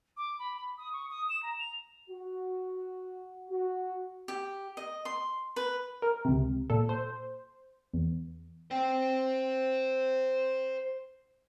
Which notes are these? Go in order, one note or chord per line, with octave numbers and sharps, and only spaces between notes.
D6
B5
B5
D#6
C#6
D#6
E7
A#5
F7
F#4
F#4
G4
D#5
C6
B4
A#4
C#2 C3
A#2 A4
C5
E2
C5 G5